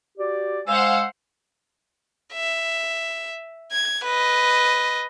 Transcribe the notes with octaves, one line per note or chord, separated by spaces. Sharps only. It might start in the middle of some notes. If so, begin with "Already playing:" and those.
F#4 G4 D5
G#3 C5 F5 F#5 G#5 E6
E5
G#6
B4 D#5